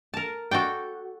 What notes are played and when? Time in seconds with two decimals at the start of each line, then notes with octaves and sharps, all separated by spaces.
0.14 A#4 A5
0.51 F#4 A4 D5 G5